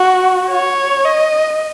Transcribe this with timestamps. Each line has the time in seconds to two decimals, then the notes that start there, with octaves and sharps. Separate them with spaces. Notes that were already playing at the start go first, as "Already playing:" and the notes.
Already playing: F#4
0.51 C#5
1.05 D#5